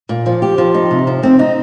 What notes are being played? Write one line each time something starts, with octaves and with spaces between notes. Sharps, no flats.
A#2
F3
G4
F3
D#4
C3
F3
C4
D#4